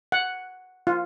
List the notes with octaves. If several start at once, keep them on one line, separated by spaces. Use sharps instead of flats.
F#5
F4